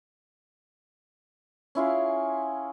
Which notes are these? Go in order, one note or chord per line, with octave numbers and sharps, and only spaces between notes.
C#4 E4 F4 G#4